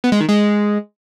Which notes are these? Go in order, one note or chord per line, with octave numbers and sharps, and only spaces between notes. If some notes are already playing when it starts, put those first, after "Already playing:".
B3
G#3
D#3
G#3